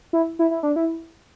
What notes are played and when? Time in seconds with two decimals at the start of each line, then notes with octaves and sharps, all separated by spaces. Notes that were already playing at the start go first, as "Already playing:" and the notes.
0.13 E4
0.39 E4
0.51 E4
0.63 D4
0.76 E4